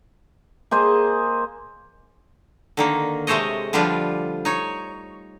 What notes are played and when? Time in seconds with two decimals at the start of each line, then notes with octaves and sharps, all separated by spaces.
0.71 A#3 G#4 C5 D#5
2.77 D3 D#3 A#3
3.27 C3 G#3 A3 C5 C#5 D#5
3.73 D3 F3 G3 D4 F4 B4
4.45 D#4 C#5